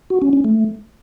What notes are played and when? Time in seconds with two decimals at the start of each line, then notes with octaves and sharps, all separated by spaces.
0.10 F#4
0.22 C#4
0.33 C#4
0.44 A3